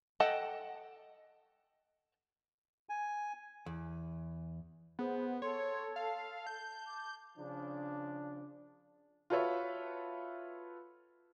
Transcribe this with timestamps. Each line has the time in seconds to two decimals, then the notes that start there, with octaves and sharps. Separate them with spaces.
0.20 A4 D#5 F#5 G5 A5
2.89 G#5
3.66 E2
4.99 B3 G#4 C5
5.42 A4 C#5 C6
5.96 F5 A5
6.47 G6
6.86 D6
7.38 C#3 F3 D4
9.30 F4 F#4 A4 B4 C#5 E5